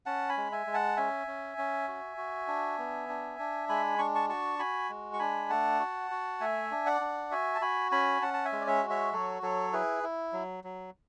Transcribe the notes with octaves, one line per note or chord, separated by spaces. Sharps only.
C#4 F#5 A5
G#5 B5
G#3
E5 G#5
G#3
F#5 A5
C#4 E5 G#5
C#4
C#4
F#4
F#4
D4
B3
D4
D4
G#3 G#5 B5
D4 C#6
A5 C#6
F#4 A5 C#6
F#4 G#5 B5
G#3
C#6
D4 G#5 B5
A3 F#5 A5
F#4
F#4
A3 E5 G#5
D4
D5 F#5
D4
F#4 E5 G#5
A5
F#4 G#5 B5
C#4 G#5 B5
C#4 F#5 A5
A5
E5 G#5
G#3
D5
C#5 E5
F#4
C#5 E5
F#3 A4 C#5
F#3 A4 C#5
E4 G#4 B4
E4
F#3
F#3